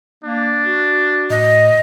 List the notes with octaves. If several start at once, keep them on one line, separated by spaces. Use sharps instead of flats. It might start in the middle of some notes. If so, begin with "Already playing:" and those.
A#3 D4
F#4
A2 D#5